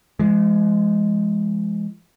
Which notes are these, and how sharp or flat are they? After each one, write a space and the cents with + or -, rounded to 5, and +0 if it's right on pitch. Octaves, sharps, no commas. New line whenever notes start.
F3 -45 G#3 +0